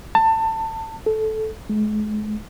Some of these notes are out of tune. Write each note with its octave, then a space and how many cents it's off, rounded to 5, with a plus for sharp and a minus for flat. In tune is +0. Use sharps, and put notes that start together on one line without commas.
A5 +25
A4 -10
G#3 +40